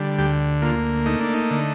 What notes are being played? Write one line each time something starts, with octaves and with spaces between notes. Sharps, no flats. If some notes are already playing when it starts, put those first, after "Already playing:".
Already playing: D3 G3
D2 G4
A#3 F4
A3 D#4
D4
D#4
D3